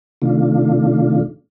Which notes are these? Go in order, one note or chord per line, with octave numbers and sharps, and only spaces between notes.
C3 D#3 A3 D4 F4